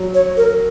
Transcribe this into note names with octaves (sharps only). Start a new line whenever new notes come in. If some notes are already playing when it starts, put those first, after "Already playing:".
Already playing: F#3
C#5
A#4